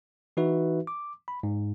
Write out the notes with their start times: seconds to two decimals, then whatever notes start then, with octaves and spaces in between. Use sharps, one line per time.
0.37 E3 D#4 F#4 B4 E5
0.87 D6
1.28 B5
1.43 G#2